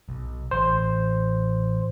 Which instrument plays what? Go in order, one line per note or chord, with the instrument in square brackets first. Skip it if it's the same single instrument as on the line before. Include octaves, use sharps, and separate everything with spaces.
[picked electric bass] B1
[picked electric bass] A1 [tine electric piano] C5